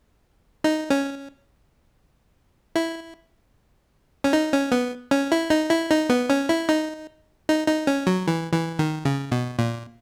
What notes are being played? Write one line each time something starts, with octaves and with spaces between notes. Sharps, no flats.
D#4
C#4
E4
C#4
D#4
C#4
B3
C#4
E4
D#4
E4
D#4
B3
C#4
E4
D#4
D#4
D#4
C#4
F#3
E3
E3
D#3
C#3
B2
A#2